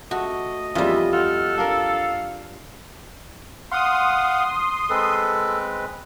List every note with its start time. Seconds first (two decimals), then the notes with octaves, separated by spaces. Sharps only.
0.11 A3 F#4 D#5
0.75 F2 E3 G3 A#3 D#4 F4 E5
1.13 F4 A4 D#5 F#5 F6
1.58 D4 A#4 F5
3.72 F5 F#5 C6 D#6
4.90 G#3 C4 A4 B4